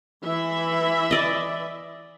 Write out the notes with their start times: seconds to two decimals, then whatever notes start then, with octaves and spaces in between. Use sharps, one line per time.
0.24 E3 E5 B5
1.11 D5 D#5